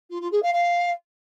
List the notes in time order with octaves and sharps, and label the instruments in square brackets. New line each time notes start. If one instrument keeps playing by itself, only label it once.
[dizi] F4
F4
G#4
F5
F5